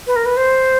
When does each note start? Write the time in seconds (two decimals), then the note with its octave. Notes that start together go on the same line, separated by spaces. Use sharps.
0.07 B4
0.16 A#4
0.26 B4
0.37 C5